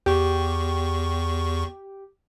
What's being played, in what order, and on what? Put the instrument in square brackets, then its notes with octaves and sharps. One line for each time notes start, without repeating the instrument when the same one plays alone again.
[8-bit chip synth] E2 C#6 [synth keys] G4